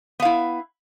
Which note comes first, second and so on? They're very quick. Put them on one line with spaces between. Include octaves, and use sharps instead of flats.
B3 F5 E4